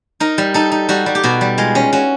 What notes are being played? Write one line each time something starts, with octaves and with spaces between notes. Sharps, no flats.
D#4 A#4
G3
D#4 A4
D#4
G3 F#4
G3
G4
B2 F#4
G3
G#3 F4
C#4
C#4 F#4